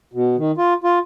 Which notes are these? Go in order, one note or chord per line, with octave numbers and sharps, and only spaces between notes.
B2
D#3
F4
F4